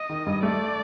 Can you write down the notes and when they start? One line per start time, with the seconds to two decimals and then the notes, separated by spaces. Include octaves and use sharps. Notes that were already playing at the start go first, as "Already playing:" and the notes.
Already playing: D#5
0.10 D#3
0.26 G2
0.43 A3 D5